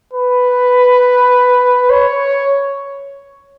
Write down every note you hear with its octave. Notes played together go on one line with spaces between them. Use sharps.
B4
C#5